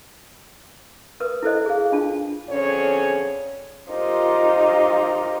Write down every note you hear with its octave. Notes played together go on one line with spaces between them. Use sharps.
A#4 B4 D#6
E4 A4 C5 D#5
G#4 F5
D4 F4 A5
F2 D3 C#4 G#4 C#5
D#4 F4 G4 A#4 C5 D#5